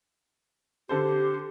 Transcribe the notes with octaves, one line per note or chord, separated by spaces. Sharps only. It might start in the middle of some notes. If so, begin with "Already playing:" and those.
D3 G4 A4 C5